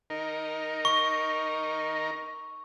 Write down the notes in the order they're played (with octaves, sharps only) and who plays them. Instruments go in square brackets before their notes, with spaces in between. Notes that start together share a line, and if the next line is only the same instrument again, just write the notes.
[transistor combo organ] D#4 A#4
[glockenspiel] C#6